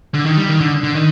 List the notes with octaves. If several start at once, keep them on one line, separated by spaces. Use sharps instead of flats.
D3
D#3
G3
D#3
D3
D3
D#3